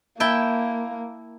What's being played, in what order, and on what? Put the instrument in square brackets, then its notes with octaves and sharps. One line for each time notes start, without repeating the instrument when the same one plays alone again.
[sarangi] A#3 [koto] E4 G5 A5